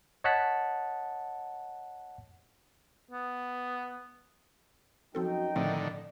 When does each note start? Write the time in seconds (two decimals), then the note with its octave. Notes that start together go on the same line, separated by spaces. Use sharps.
0.24 C#5 D#5 F#5 A5 F#6 B6
3.12 B3
5.15 F#2 F3 C4 D#4 F#4 A4 G5
5.56 A2 D3 D#3 F3 A3 C4 D5